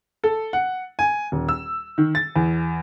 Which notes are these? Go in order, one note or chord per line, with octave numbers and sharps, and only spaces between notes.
A4
F#5
G#5
D#1
E6
D#3
A6
E2